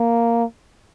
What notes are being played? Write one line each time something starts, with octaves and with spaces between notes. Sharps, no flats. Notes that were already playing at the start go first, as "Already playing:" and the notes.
Already playing: A#3